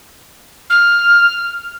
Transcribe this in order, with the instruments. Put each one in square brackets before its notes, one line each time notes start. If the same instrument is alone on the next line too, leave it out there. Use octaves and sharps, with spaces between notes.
[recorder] F6